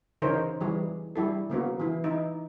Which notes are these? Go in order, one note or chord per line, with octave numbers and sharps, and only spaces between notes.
C#3 E3 D#4 A#4 C5 C#5
E3 G3 G#4
G3 E4 A4
C#3 A#3 B3 F#4
E3 E4
E3 D#4 E4